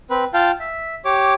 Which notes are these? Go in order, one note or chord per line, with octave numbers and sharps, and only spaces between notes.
C4 B4
F4 F5 G5 A5
E5
G4 C#5 D6